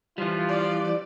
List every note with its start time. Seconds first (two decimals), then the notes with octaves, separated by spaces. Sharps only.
0.18 E3 F3 G3 F4
0.48 D5